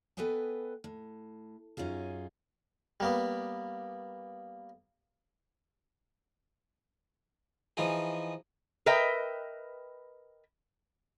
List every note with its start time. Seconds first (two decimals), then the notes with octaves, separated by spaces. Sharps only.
0.17 B3 A4 B4 D#5 G5 G#5
0.84 A2
1.77 F#2 C#4 D#4 F4 G#4
3.00 G3 A#3 B3
7.77 E3 F3 D#4 G#4
8.86 A#4 B4 D#5 E5 G5